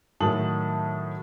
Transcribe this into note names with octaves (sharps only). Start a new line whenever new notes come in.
A2 D#3 F#3 A5 D#6 F#7